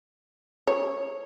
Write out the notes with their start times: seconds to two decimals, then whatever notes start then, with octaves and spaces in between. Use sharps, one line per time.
0.67 C#5